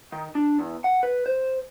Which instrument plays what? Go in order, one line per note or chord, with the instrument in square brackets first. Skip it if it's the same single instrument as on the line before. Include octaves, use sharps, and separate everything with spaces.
[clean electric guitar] D#3
D4
E2
F#5
B4
C5